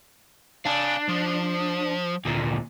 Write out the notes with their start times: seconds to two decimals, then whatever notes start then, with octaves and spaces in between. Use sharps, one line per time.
0.66 D4 F5 G#5
1.08 F3
2.25 D2 A#2